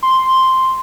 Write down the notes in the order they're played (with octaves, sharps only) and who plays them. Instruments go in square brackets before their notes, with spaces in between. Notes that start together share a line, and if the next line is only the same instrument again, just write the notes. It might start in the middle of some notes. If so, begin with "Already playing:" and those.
[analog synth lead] C6